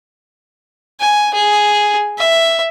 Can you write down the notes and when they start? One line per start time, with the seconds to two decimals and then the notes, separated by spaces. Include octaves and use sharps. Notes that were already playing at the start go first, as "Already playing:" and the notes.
1.00 G#5
1.34 G#4
2.19 E5